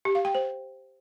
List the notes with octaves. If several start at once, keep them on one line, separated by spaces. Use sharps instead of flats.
G4
F5
G5
C5